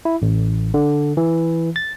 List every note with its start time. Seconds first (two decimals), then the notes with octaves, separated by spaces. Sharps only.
0.05 E4
0.22 A1
0.74 D3
1.17 E3
1.76 A6